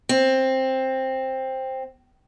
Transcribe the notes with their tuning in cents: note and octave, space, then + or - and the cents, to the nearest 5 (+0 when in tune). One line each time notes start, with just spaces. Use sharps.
C4 +10